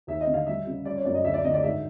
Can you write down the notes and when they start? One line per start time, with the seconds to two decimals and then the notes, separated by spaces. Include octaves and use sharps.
0.07 D#2 E5
0.21 D#5
0.27 D3
0.34 F5
0.47 G3 E5
0.67 C#3
0.85 G3 D5
0.96 C#5
1.05 F#2 D5
1.15 D#5
1.24 D2 E5
1.34 D5
1.44 D3 D#5
1.54 D5
1.63 G#2 E5